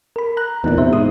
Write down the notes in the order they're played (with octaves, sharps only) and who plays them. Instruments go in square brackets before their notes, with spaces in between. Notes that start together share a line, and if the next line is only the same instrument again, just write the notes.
[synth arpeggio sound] A#4 B5
A#5 F#6
[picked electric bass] E2 A#2 [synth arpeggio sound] B3 D#4
[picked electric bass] C3 [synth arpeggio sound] D#4 C5 E5
[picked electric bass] G#2 [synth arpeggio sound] D#6